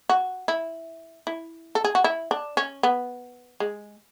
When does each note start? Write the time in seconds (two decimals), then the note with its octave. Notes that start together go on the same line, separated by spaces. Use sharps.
0.09 F#4
0.48 E4
1.27 E4
1.75 A4
1.84 G#4
1.95 F#4
2.04 E4
2.31 D4
2.57 C#4
2.83 B3
3.60 G#3